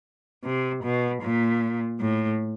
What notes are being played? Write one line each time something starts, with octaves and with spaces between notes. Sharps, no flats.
C3
B2
A#2
A2